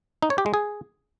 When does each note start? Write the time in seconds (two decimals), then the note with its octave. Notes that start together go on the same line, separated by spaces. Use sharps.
0.22 D#4
0.30 C#5
0.38 G4
0.46 G#3
0.54 G#4